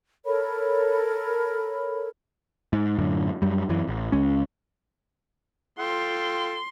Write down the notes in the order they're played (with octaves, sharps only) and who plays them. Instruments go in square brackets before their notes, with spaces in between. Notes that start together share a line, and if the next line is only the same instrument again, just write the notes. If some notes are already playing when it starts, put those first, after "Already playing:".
[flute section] A4 A#4 C#5 B5
[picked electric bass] G#2
F#2 A2 D3
F#2 G3
F#2 E3
A1
C#2 G#3 C#4
[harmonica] F4 A4 G5 [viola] C6